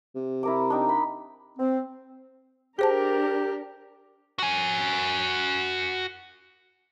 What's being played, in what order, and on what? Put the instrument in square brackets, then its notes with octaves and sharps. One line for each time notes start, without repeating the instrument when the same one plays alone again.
[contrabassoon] C3
[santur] E4 A#4 D6
D4 D#4 G5
B5
[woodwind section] C4
[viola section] D4 A#4 [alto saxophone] G4 [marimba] G#4 C5 A5
[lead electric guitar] F#4 G#5